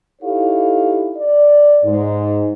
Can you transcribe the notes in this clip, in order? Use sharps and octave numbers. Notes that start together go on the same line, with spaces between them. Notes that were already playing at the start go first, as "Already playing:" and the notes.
D#4 E4 G4 A4 C#5 F5
D5
G#2